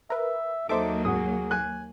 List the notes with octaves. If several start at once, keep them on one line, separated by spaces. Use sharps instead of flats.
A#4 B4 E5
D#2 F#3 A#3 D#4 A4 C5 E5 D6
G1 C2 G#2 F#4 G#4 D#6
G#5 F#6